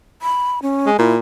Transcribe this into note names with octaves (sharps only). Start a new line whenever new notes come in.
B5
C#4
G#3
A#2 E4